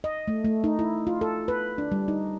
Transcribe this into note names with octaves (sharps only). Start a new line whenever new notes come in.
D#5
A3
A3
D#4
E4
F4
A4
B4
D4
G3
D#4